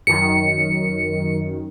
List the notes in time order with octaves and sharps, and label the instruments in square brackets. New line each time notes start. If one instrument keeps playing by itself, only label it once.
[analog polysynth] F#2 D#3 [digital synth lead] C#7